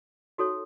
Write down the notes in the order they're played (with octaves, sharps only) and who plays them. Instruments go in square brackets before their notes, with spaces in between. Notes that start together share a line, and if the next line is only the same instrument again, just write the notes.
[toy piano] D#4 F#4 A4 C#5